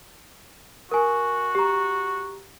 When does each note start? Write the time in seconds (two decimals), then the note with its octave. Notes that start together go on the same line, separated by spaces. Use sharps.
0.91 F#4 A#4 G#5
1.55 G4 A#5